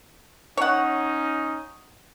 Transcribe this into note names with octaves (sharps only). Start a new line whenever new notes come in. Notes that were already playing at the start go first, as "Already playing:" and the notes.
C#4 D#4 C#5 F#5